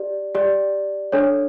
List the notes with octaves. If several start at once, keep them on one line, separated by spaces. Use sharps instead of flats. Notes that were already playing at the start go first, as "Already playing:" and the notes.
Already playing: G4 D5
G4 D5
D4 A4 C#5